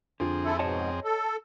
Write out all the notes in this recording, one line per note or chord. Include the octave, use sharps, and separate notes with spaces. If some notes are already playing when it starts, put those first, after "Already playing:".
F2 D3 C4 F4 G#4
E4 A4
G#2 B2 C#5 D#5 A5
A4